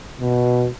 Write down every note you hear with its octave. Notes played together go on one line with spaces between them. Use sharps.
B2